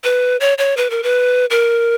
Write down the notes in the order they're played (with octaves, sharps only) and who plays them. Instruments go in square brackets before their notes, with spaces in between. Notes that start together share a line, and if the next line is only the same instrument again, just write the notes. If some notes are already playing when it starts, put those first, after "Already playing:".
[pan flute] B4
C#5
C#5
B4
A#4
B4
A#4